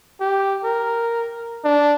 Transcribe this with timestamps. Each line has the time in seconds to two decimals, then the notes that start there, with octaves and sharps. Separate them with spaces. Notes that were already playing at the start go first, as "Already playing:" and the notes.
0.20 G4
0.64 A#4
1.64 D4